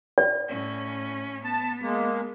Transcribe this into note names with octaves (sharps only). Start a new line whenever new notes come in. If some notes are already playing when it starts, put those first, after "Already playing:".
D5
A2 C#4
B3 A5
G#3 A#3